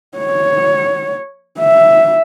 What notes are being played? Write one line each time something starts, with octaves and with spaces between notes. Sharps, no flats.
C#5
E5